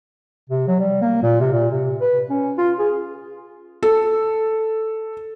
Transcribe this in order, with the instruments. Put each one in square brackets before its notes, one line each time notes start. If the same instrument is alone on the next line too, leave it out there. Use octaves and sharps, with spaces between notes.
[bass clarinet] C3
F#3
G3
A#3
A#2
C3
A#2
C3
B4
C#4
F4
G#4
[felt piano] A4